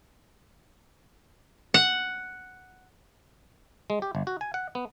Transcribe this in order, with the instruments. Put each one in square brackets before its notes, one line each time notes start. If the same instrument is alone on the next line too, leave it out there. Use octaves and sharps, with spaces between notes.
[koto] F#5
[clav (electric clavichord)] G#3
G4
G1
F#4
G#5
F#5
B3